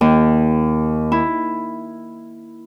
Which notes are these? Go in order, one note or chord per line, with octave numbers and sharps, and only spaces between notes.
D#2
E4